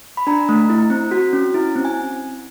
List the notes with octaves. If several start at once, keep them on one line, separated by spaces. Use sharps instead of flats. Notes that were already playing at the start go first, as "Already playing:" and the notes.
B5
D4 A#5
A3
E4
C4
F#4
C#4
E4
C4
G#5